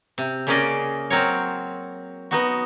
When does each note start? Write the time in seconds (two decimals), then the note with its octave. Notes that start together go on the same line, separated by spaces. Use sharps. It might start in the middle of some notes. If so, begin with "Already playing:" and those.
0.18 C3
0.47 C#3 A#3 C#4 G#4 D5 D#5
1.10 F#3 C4 A#4 C#5
2.31 B3 D#4 F#4